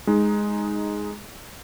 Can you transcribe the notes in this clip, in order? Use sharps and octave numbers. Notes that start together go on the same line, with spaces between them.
G#3 D#4